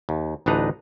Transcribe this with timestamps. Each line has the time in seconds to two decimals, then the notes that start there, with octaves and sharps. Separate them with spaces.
0.09 D#2
0.46 A1 D2 D4 D#4 B4 A#5